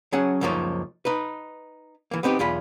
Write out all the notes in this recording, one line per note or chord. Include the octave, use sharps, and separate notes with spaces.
F#3 C#4 G#4 F#5
C#2 F#2 F3 A#3 D#4 C#5
D#4 B4
E3 A#3
B3 C4 D#4 G4
B1 E2 F4 G#4 B5